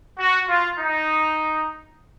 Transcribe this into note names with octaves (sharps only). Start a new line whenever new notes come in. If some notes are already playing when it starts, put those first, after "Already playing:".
F#4
F4
D#4